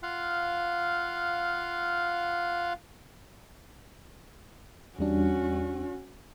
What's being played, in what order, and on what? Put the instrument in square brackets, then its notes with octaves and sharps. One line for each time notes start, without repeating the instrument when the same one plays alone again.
[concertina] F4 F5 F#5
[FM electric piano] E2 G3 D4 [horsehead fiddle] C#4 F#4